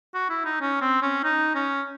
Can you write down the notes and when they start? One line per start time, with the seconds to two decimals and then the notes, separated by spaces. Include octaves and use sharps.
0.15 F#4
0.30 E4
0.45 D#4
0.61 C#4
0.82 C4
1.02 C#4
1.24 D#4
1.55 C#4